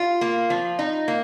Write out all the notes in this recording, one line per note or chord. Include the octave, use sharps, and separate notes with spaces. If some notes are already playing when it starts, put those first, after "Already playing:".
Already playing: F4
A#3
F3
D#4
A#3